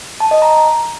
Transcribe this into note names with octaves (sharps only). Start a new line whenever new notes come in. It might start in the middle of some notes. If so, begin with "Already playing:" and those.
A5
D#5
A#5